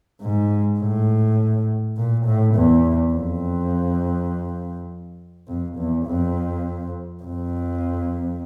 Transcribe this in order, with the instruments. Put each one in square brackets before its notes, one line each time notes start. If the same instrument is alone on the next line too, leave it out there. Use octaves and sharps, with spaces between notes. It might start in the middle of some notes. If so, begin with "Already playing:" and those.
[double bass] G#2
A2
A#2
A2
E2
F2
F2
E2
F2
F2